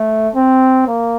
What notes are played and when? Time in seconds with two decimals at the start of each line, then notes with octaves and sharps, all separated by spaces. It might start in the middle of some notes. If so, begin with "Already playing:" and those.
Already playing: A3
0.35 C4
0.87 A#3